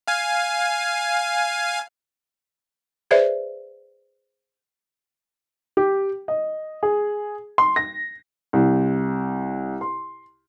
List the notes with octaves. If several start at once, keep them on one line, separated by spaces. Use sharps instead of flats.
F5 G#5
G#4 B4 C5 D5 E5
G4
D#5
G#4
C6
A#6
C2
C6